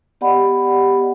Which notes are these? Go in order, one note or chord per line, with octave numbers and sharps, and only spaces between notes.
B3 G4 D5 D#5 F#5 B5